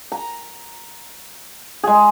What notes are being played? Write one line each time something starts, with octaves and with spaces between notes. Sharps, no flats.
A#5
G#3 G#4